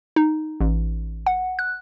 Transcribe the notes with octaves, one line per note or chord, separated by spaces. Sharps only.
D#4
A1
F#5
F#6